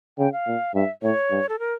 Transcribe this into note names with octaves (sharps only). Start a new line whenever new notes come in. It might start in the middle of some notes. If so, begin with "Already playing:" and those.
C#3 G5
F5
A#2
G2 E5
A2 C#5
G2
A4
A#4